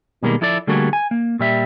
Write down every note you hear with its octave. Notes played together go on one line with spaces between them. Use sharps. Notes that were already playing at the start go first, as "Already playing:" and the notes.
B2 D#3 G3 G#3 A#3
F3 E4 A4 D5
D3 G3 A3 A#3 F#4 G#4
G#5
A#3
A#2 G3 E5